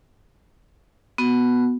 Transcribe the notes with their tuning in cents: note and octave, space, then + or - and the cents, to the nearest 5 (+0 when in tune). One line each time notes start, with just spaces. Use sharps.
B3 +0 F#4 +0